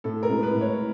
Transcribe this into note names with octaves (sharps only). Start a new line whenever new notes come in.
A2 A4
A#4
G#3
B4
A2
C#5